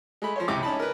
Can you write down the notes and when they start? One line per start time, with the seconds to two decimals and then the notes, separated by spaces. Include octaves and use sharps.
0.22 G#3 A3 B5
0.36 F3 C5 C#5
0.48 C#2 C3 E3 G5 D6
0.63 C#4 D#4 A5 B5
0.79 A#4 B4